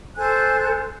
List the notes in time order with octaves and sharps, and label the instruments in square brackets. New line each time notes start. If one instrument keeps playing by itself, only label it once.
[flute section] A4 C5 G#5 F#6